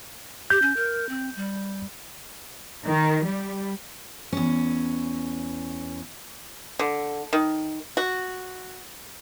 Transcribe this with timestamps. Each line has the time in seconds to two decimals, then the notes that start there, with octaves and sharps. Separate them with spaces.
0.50 G4 G6
0.62 C#4
0.76 A#4
1.09 C4
1.36 G3
2.85 D#3
3.25 G3
4.33 E2 C#4
6.79 D3
7.33 D#3
7.97 F#4